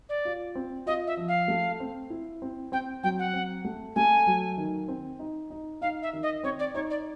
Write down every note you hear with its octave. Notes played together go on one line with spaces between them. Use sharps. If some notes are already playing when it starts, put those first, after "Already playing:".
D5
F4
C4
F4 D#5
E5
F3
F5
A3
C4
E4
C4
C4 G5
F#3 G5
F#5
C4
A3
A3 G#5
F#3
D#3
C4
D#4
D#4
D#4 F5
E5
D#3
D#5
C4 C#5
D5
D#4 C#5
D5